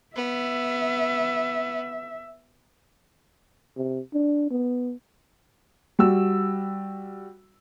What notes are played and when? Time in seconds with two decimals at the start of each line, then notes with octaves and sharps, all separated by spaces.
0.16 B3 E5
3.77 C3
4.13 D4
4.51 B3
5.99 G3 F#4 E6